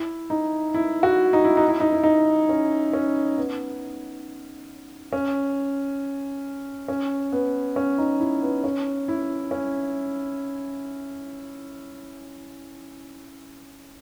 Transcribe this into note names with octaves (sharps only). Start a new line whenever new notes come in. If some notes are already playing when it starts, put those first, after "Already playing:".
Already playing: E4
D#4
E4
F#4
D#4
E4
D#4
E4
D#4
E4
D#4
C#4
C#4
B3
C#4
C#4
B3
C#4
D#4
E4
B3
C#4
E4
C#4